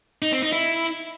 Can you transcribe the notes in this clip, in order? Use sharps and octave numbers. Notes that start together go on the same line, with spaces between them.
D#4
C4
D#4
E4